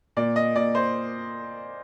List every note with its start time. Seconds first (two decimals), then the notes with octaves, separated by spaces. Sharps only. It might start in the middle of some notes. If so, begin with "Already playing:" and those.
0.17 A#2 D5
0.36 D#5
0.56 A#2 D5
0.75 C5